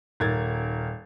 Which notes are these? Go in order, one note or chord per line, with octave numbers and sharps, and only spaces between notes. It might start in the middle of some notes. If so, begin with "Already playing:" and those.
D#1 A#4 G#6 A6